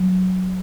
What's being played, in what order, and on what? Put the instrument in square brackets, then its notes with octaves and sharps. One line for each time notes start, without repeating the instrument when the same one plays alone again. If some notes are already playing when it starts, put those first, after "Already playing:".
Already playing: [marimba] F#3